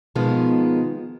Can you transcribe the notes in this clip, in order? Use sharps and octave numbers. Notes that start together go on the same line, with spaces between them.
B2 D#3 F3 G#3 B3